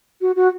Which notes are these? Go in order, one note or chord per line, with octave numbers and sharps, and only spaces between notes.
F#4
F#4